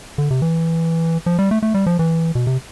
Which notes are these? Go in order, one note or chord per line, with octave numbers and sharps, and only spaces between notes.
D3
C3
E3
F3
G3
A3
A3
G3
F3
E3
B2
C3